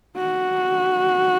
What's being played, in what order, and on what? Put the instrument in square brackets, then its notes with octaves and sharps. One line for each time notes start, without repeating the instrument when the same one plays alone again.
[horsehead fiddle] F#4